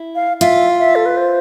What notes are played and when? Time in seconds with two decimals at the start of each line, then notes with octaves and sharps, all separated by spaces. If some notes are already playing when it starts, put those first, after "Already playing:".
Already playing: E4
0.15 F5
0.41 F4 E5
0.79 E5
0.96 A4
1.06 B4
1.17 C5